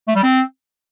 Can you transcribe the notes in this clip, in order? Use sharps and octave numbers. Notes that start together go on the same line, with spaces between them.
A3
G3
C4